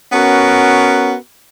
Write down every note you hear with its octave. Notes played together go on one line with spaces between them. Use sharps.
B3 C#4 F#4 A#4